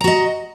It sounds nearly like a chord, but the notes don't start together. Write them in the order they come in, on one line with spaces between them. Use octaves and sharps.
A#5 F#4 D#5